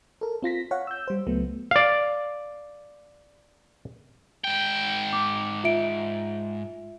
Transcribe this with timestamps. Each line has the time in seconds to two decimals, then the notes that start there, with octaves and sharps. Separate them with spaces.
0.21 A4 A#4
0.43 C4 F4 A#6 B6
0.71 C#5 F5 F#5
0.87 E6 G6
1.08 G3 C5
1.27 C#2 F#3 A3 B3
1.71 D5 F5
4.44 G#2 G5
5.13 D6
5.64 F4 E5 D7